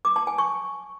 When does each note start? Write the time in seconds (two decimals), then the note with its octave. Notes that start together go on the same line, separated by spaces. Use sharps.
0.05 D6
0.16 A5
0.27 G#5
0.38 C#6